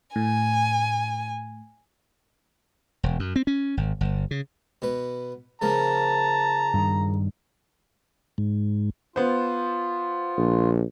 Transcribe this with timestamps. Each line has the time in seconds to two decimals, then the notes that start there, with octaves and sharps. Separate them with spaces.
0.16 A2 G#5
3.03 E1
3.20 F#2
3.36 C4
3.47 C#4
3.77 G#1
4.01 G1
4.31 C#3
4.82 B2 B4
5.62 C#3 F3 A#3 A5 A#5
6.74 G2 D#3
8.38 G#2
9.16 B3 F4 C5
10.38 A#1